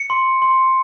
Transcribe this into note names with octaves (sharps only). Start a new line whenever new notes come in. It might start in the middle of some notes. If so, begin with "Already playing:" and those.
Already playing: C#7
C6
C6